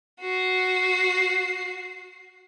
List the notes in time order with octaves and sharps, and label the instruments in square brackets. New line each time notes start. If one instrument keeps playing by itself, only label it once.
[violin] F#4 C7